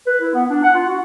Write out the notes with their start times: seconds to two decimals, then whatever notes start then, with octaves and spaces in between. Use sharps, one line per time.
0.06 B4
0.20 E4
0.34 B3
0.50 D4
0.63 F#5
0.75 F4
0.87 F#4